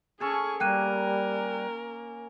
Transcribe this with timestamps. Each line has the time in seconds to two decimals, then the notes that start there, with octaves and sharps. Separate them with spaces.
0.20 C#4 G#4 A4 G#5 C#6
0.60 G3 A#3 A#4 G5 F#6 D#7